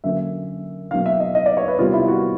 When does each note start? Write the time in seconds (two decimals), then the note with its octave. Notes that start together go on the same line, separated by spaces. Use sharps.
0.04 D3 F#3 A#3 C#4 E5
0.91 B2 F#3 A#3 D4 F5
1.06 E5
1.20 D#5
1.35 D#5
1.46 D5
1.57 C#5
1.68 B4
1.79 C3 D#3 G3 B3 F4
1.93 E4
2.08 F#4